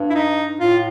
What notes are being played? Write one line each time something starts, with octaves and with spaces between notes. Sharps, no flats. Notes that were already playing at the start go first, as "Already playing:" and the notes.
Already playing: G2
E4
D#4
A2 F4